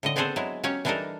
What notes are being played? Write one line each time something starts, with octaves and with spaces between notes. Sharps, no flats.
A2 D3 D#5
B3 C4 D4 G#4 A4 C5
F#3 G#3 E4
F#3 C#4 G4 C#5
E3 G3 D4 D#4 A4 A#4